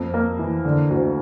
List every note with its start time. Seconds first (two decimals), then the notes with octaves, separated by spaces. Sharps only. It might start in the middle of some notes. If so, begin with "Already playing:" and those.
Already playing: F2 A#3
0.14 A#3
0.39 E3
0.65 D3
0.90 D2